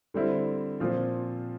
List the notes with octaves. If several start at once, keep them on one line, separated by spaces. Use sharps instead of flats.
D3 G3 C4 E4
A#2 F3 C4 F4